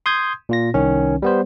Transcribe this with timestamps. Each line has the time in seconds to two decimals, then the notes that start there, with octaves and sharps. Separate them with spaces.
0.06 C6 D#6 G6 G#6
0.49 A#2 F4 A#6
0.74 C2 D#3 C#4
1.22 G3 B3 C5